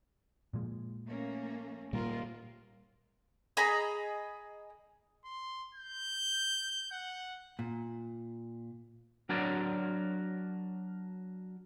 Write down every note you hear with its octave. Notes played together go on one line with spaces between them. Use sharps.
A#2 F3 G#3
A3 A#3 C#4
A#2 G3 F4 A#4
G#4 D#5 A#5 B5
C6
G6
F#5
A#2
F#3 D4 F#4 A#4 C#5 D5